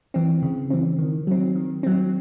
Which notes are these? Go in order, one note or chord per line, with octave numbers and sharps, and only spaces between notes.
E3 C4
C#3
E3 C4
D#3
F#3 C4
D#3
F#3 C4